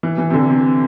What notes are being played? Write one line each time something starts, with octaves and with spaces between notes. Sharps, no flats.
E3
E3
C3
D3
C3